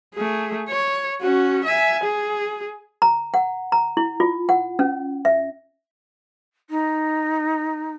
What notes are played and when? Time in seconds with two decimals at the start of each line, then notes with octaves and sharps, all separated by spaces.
0.15 A3 G#4
0.68 C#5
1.21 C#4 F#4
1.65 E5 G#5
2.04 G#4
3.02 A#5
3.34 F#5
3.72 A#5
3.97 E4
4.20 F4
4.49 F#5
4.79 C#4
5.25 E5
6.70 D#4